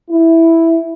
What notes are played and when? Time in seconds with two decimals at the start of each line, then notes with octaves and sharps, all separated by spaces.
0.10 E4